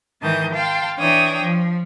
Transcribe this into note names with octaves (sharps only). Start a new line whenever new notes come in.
G#2 D#3 E3 A5 D#6 G6
F5 G5 A5 C6
E3 D4 C#5 G5 D#6
F3